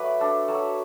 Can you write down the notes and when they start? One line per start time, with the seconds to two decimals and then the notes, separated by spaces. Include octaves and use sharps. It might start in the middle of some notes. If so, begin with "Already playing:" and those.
Already playing: F#3 A3 B4 D5
0.20 D4 A4
0.48 F#3 A4